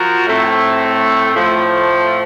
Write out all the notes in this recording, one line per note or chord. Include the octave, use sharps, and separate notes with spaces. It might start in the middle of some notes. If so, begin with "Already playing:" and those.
Already playing: F3 F#4 A#4
A2 A3 C4
A2 F3 A3